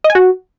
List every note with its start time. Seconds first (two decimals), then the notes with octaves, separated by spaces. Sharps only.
0.04 D#5
0.10 G#5
0.15 F#4